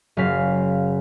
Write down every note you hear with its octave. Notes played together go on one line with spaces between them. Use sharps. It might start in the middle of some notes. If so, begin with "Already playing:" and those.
F#1 C#3 F5 B6